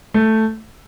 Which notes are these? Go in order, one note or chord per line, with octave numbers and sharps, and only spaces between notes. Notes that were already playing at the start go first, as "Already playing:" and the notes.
A3